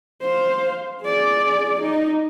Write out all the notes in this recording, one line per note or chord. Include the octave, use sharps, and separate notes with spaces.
C5 F5
G#4 D5
D#4